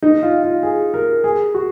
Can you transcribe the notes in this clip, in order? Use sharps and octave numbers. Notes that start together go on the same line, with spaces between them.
D#4
F4
F4
G#4
A#4
G#4
F#4